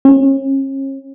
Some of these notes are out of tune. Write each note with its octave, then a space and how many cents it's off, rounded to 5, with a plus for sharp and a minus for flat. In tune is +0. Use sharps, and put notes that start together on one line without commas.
C#4 -40